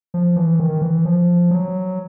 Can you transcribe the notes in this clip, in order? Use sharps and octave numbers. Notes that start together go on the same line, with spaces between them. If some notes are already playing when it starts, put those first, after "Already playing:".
F3
E3
D#3
E3
F3
F#3